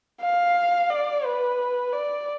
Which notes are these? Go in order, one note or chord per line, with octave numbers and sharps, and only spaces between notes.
F5
D5
B4
D5